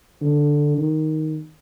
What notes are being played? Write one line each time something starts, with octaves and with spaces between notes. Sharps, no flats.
D3
D#3